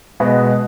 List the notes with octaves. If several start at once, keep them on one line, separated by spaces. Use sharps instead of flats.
B2 G#3 B3 F#4